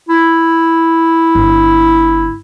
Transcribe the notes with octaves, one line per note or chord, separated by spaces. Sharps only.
E4
G1